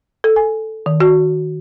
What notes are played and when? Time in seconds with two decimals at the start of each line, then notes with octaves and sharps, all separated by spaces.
0.24 A4
0.36 G#5
0.86 D#3
1.00 F#4